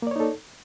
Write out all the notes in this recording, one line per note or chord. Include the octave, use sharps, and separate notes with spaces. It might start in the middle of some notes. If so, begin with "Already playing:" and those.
A#3 D#4 A4 C#5 D5